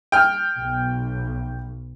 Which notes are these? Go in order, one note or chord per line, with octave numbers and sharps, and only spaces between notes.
G5 F6
B1